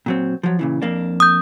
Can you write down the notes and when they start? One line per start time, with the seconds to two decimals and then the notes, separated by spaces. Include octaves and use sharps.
0.06 A#2 F#3 C4
0.43 F3 F#3
0.59 A#2 C#3 E3
0.82 F2 A#3 D4
1.20 D#6 G6